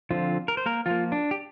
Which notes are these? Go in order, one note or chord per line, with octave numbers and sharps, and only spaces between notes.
D3 F3 C4 F4
A#4
C5
A#3 A#4
F3 A#3 F4
D4
G4